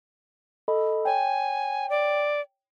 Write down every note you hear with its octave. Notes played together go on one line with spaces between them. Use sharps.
A4 D#5 B5
C#5 G5 G#5
D5